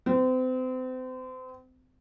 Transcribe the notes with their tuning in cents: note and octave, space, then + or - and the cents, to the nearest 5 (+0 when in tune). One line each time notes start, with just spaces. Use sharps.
C4 -35